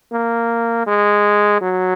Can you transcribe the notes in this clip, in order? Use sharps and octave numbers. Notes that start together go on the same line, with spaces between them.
A#3
G#3
F#3